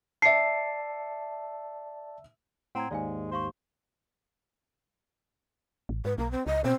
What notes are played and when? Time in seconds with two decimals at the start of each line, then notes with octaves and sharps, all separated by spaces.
0.22 D5 E5 A5 C7 C#7
2.75 A2 C4 F#5 A#5 G#6
2.91 D#2 G#2 G#3 D5 F5 G#5
3.31 G4 C5 F5 C#6
5.89 A1
6.05 G#2 B4
6.18 B1 A#3
6.31 C4
6.46 C#2 D#5
6.64 B2 C4